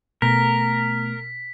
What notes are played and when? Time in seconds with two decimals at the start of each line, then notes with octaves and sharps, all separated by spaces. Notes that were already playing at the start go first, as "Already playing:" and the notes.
0.22 B2 A3 B3 A#4 B6